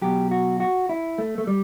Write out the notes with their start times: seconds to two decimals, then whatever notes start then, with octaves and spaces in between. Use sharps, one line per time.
0.01 B2 F#3 G4
0.31 F#4
0.60 F#4
0.89 E4
1.18 A3
1.38 A3
1.47 G3